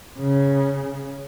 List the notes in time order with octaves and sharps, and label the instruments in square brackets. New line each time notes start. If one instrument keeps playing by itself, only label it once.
[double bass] C#3